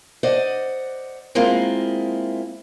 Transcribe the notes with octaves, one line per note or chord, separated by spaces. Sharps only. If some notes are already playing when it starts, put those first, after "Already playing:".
C5 D5 D#5 F#5
G#3 A#3 C4 E4 F4